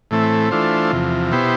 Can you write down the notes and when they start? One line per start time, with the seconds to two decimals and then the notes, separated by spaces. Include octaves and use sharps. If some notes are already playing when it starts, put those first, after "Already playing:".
0.11 A2 E3 A3 C4
0.51 E3 A3 D4 F4 C5
0.91 E2 C3 F3
1.32 B2 B3 E4 G4 C5